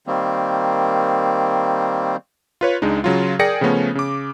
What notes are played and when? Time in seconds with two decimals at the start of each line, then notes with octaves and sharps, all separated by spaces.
0.07 D#3 G3 A#3 C4
2.61 F4 B4 C#5
2.82 C#2 G#3 D4 D#4
3.04 C#3 F#3 F4
3.39 G#4 A#4 D5 G5 A#6 C#7
3.61 C#3 F3 A3 B3 C#4
3.95 C#3 D6